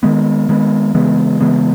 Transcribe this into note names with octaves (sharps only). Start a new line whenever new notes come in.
D#3 G#3 B3
D#3 G#3 B3
C#3 E3 G#3 B3
C#3 E3 G#3 B3